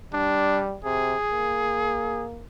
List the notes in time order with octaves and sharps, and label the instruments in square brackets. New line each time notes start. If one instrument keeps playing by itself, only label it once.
[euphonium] G3 [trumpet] D4
[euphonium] C3 [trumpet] G#4
[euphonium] A#3